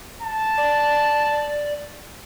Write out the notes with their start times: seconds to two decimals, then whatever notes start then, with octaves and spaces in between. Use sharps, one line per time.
0.22 A5
0.57 D5